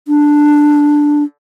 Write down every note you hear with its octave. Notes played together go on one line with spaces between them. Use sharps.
D4